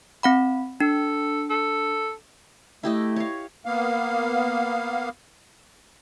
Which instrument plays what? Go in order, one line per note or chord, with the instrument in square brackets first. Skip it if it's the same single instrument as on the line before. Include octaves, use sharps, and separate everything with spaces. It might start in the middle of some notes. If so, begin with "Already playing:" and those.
[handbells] C4 F#5 B5
[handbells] D4 [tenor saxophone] A4
[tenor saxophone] A4
[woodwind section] A3 [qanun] E4 G4 D#5
[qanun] C#5 F5
[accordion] A#3 B3 F5